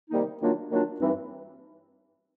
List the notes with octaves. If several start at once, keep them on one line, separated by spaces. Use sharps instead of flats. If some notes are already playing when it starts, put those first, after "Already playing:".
C3 D#3 G3 A#3 D#4
D#3 F#3 A#3 D4 F4
D#3 F#3 A#3 D4 F4
G2 E3 G3 C4 D#4